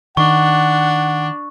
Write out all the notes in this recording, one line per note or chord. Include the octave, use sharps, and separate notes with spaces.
D#3 D4 F#5 C#6